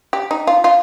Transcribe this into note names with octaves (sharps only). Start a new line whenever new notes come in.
G4
D#4
F4
F4